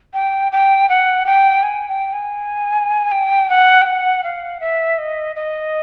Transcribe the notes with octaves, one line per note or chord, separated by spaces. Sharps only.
G5
G5
F#5
G5
G#5
G5
G#5
G5
F#5
G5
F#5
F5
E5
D#5
D#5